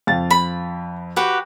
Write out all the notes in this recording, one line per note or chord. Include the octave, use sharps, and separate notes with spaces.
F2 F5 A6
B5
F#4 G4 B4